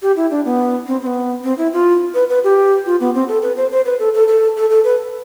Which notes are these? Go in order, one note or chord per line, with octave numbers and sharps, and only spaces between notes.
G4
E4
D4
B3
C4
C4
B3
C4
E4
F4
B4
B4
G4
F4
B3
C4
A4
B4
C5
C5
B4
A4
A4
A4
A4
A4
B4